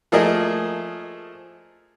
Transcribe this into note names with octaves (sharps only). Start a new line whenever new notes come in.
F3 A3 A#3 G#4 A#4 D#5